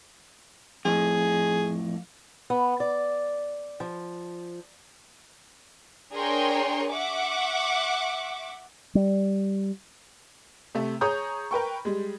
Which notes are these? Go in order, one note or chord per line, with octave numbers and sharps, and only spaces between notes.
F2 A2 G#4
B3
D5
F3
D4 G#4 A#4 C#5 G5 C6
E5 F#5 C#6 D6
G3
C3 A3
G#4 C#5 A#5 C#6 D#6 G6
A#4 B4 G5 C#6
G3 G#3